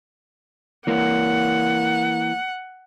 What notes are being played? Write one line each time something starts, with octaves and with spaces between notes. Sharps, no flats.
E3 A#3 F#5